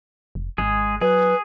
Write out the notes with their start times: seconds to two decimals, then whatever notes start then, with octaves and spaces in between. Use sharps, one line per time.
0.35 F1
0.58 G#1 G#3 G#4
1.01 F#3 G#4 B4